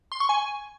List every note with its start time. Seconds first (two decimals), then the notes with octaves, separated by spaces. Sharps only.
0.12 C6
0.20 C#6
0.29 G#5